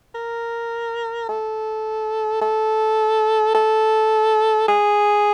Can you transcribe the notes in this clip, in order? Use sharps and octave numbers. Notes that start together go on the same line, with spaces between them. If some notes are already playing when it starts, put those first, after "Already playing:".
A#4
A4
A4
A4
G#4